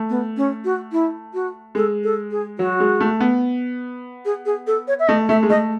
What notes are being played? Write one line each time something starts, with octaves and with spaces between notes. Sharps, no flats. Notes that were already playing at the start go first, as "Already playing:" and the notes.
Already playing: A3
B3
C#4
F#4
E4
F#4
G#3 A4
A4
G#4
F#3 F#4
G#3
A3
B3
G#4
G#4
A4
C#5
E5
A3 D#5
A3 E5
G#3
A3 D#5